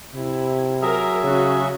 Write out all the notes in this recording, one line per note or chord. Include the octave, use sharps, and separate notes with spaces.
C3 E4
F#3 G#4 A#4 E5
C#3 C#4 F#4